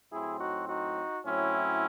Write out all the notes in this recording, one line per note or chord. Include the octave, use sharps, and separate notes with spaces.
A2 F#3 C4 E4 G#4
D#4 F#4
D#4 F#4
A2 F#3 C4 C#4 E4